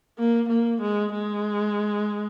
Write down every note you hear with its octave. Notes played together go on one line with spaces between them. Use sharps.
A#3
A#3
G#3
G#3